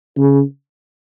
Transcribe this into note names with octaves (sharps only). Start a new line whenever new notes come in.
C#3